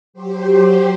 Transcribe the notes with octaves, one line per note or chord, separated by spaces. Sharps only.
F#3 G4 C5